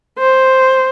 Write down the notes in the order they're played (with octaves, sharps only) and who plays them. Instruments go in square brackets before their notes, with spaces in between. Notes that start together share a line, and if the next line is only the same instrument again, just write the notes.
[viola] C5